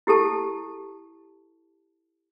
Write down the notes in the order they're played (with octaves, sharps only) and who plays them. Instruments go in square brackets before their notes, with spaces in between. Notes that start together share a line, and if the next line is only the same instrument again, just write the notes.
[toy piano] E4 G4 A4 A5